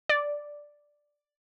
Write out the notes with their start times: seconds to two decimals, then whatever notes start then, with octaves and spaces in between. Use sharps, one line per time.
0.09 D5